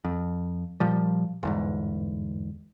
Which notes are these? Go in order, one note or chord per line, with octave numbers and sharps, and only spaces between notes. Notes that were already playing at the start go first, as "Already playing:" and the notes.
F2
A#2 F3 G3
G1 E2 G#2